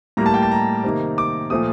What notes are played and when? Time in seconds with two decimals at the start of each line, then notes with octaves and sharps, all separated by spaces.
0.17 A2 G3 A#3 A#5
0.26 A5
0.34 G5
0.42 A5
0.51 A#5
0.84 C3 D#3 A#3
1.18 D6
1.50 A#2 F3 A3 D#6